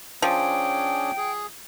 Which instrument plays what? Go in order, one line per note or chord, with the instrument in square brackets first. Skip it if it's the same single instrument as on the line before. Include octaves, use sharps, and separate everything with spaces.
[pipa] F3 [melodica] C#4 D4 G#4 [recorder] G5
[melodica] G#4